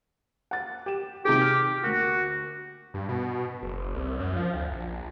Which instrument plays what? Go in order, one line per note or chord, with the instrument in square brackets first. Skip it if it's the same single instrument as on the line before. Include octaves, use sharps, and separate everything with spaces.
[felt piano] F#5 A6
G4 E7
[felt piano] C3 D#4 G#4 [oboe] G4
[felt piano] F6
[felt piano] D2 A#3 [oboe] F#4
[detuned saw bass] G2
B2
F#1
C2
F#2
F3
D2
A#1